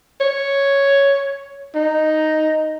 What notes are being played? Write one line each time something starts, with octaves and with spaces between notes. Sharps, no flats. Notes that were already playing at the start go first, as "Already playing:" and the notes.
C#5
D#4